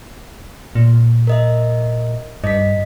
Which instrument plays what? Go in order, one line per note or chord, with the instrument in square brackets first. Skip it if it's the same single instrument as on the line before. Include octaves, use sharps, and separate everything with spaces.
[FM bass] A#2
[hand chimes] A#4 D#5 E5
[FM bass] G2 [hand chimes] D#5 B6